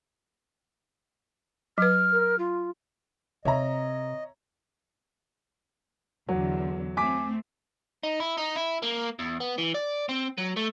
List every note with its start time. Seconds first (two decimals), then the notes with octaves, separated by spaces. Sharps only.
1.78 F#3 B4 F6
2.12 A#4
2.39 F4
3.45 C3 C#5 D#5 E5 A#5
6.29 E2 D3 F#3
6.97 A3 C4 G#5 D6 B6
8.03 D#4
8.20 E4
8.37 D#4
8.56 E4
8.83 A#3
9.19 E2
9.40 B3
9.58 E3
9.74 D5
10.09 C4
10.38 F#3
10.57 A3